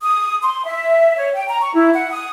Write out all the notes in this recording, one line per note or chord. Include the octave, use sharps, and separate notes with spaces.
D#6
C6
E5
C#5
G5
A#5
C#6
E4
F#5
D#6